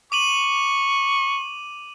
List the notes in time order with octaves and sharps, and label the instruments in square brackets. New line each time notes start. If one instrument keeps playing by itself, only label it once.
[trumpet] C#6 [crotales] D6 D#7 F#7